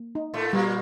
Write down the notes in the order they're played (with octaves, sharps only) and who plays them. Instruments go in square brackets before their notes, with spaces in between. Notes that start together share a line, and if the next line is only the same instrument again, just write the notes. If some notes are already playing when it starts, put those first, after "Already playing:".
Already playing: [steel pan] A#3
D#4
[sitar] A2 A3
[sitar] A#2 A#3 [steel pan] G3